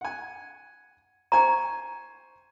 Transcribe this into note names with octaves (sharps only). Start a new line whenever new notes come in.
F#5 G#5
C5 G#5 A#5 C#6